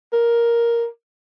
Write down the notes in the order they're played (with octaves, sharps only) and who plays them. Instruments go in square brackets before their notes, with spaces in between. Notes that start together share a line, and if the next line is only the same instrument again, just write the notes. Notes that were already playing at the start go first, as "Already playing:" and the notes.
[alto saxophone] A#4